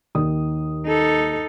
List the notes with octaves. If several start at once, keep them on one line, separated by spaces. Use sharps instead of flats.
D#2 D#3 D#6
D#4 A4